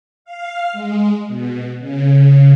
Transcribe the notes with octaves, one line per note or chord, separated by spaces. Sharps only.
F5
G#3
B2
C#3